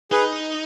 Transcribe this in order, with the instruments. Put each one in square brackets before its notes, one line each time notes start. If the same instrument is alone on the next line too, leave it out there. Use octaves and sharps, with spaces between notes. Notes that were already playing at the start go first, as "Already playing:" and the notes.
[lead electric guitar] D#4 [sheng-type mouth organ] G#4 B4